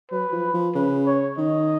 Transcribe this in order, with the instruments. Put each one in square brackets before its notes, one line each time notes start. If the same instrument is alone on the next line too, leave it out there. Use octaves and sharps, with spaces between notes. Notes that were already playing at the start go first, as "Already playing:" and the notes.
[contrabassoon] F#3 [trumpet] B4
[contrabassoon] F3
F3
[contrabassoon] C#3 [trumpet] B4
[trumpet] C#5
[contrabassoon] D#3 [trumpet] D#5